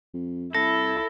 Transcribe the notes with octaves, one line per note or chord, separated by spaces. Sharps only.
F2
C2 E4 A4 A#6